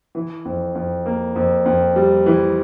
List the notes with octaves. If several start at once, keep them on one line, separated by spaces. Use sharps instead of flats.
E3
F2
F2
A#3
F2
F2
G3
E3